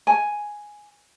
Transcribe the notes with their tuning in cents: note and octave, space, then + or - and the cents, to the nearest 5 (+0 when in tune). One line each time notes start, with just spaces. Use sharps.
G#5 +0